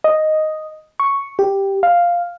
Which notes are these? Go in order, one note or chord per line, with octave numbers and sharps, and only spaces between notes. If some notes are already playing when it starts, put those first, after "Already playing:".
D#5
C#6
G4
F5